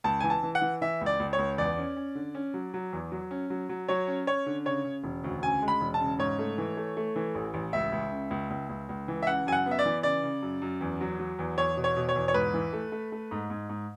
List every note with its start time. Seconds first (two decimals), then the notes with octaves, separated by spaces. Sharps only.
0.04 C#2 A5
0.20 E3 G#5
0.30 A5
0.43 E3
0.55 F#5
0.61 E3
0.81 E3 E5
1.01 C#2
1.06 D5
1.20 C#2
1.33 C#5
1.38 C#2
1.58 E2 D5
1.78 C#4
1.96 C#4
2.15 D3
2.35 C#4
2.54 F#3
2.74 F#3
2.93 E2
3.12 F#3
3.31 C#4
3.50 F#3
3.69 F#3
3.88 F#3 C#5
4.07 C#4
4.27 C#4 C#5
4.46 D3
4.65 C#3 C#5
4.84 C#3
5.04 E1
5.24 D2
5.42 C#3 G#5
5.62 G#3
5.68 B5
5.81 E1
5.94 A5
6.01 C#3
6.19 G#2 C#5
6.39 A3
6.58 E3
6.77 A3
6.97 A3
7.16 E3
7.35 A1
7.54 A1
7.73 C#2 E5
7.92 C#2
8.12 C#3
8.31 C#2
8.50 C#2
8.69 C#2
8.89 C#2
9.08 E3
9.23 E5
9.27 C#3 F#5
9.47 F#2 G#5
9.52 F#5
9.66 B3
9.71 E5
9.79 D5
9.85 E3
10.03 C#3 D5
10.23 C#3
10.42 F#2
10.62 F#2
10.81 E2
11.01 F#3
11.19 F#3
11.39 E2
11.58 E2 C#5
11.77 B2
11.84 C#5
11.96 B2
12.09 C#5
12.16 E2
12.28 C#5
12.34 G#2 B4
12.54 E3
12.73 A3
12.92 A3
13.12 A3
13.31 G#2
13.50 G#2
13.69 G#2